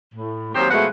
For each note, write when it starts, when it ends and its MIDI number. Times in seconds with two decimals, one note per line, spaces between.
0.15 0.50 45
0.55 0.71 39
0.55 0.71 51
0.55 0.71 54
0.55 0.71 60
0.55 0.71 67
0.55 0.71 72
0.71 0.85 47
0.71 0.85 53
0.71 0.85 56
0.71 0.85 57
0.71 0.85 71
0.71 0.85 78